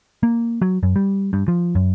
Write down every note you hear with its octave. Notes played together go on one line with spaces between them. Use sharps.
A#3
F#3
F#2
G3
G2
F3
F#2